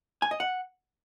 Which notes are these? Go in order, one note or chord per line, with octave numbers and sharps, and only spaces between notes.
G#5
D#5
F#5